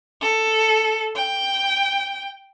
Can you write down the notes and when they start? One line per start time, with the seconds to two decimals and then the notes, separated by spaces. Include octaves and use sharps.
0.20 A4
1.14 G5